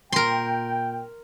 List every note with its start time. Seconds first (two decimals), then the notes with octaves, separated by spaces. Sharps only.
0.12 A#2 A#4 G5 C6